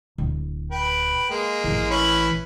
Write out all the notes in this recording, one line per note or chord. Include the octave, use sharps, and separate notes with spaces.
D1
B4 G5
G#3 A#3
A1 E3
C#4 E4 B4